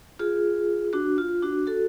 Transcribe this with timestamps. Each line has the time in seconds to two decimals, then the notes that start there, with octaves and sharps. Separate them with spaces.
0.19 F4 G#4
0.93 D4 F#4
1.18 F4
1.43 D4 F#4
1.67 F#4 A4